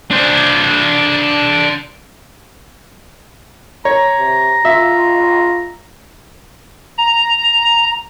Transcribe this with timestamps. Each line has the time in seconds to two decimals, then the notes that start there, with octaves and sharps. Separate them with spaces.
0.11 D4 C5
3.85 C#5 A#5
4.19 C3
4.65 F4 E5
6.98 A#5